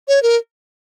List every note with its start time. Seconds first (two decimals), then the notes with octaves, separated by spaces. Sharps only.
0.08 C#5
0.23 A#4